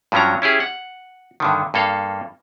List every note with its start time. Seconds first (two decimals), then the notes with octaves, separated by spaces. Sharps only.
0.12 G2 F3 F#3 C#4 D4 A#5
0.42 C#4 E4 G4 G#4
0.60 F#5
1.40 G2 D3 D#3
1.74 G2 A#3 A4 F5